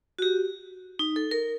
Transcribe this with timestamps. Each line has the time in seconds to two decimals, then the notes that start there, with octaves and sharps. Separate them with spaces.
0.19 F#4
0.22 G4
0.99 D#4
1.16 A4
1.31 A#4